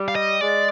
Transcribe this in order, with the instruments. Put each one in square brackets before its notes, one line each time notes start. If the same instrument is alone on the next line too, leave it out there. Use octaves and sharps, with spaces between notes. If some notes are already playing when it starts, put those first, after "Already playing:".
Already playing: [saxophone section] G3
[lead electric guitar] F5
D#5
[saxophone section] G#3 [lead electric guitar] D5